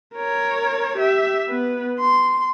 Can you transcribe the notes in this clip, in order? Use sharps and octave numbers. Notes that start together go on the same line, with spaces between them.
A#4 C#5
G4 E5
B3 B4
C6